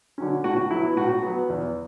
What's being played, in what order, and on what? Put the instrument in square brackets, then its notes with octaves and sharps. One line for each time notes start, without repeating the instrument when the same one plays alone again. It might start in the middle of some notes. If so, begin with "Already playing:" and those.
[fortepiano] D3 F#3 C#4
A2 F#4
F#3 B3 E4
A2 F#4
F#3 B3
E2